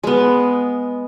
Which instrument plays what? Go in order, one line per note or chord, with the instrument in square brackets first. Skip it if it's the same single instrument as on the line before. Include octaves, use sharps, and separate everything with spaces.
[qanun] G#3 B3